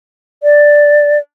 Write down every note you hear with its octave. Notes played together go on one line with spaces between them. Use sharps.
D5